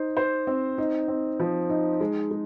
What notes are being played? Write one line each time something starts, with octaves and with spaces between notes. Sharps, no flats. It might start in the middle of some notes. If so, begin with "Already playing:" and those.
Already playing: D#4 C5
C5
C4
D#4
C4
F3
D#4
G#3
G#3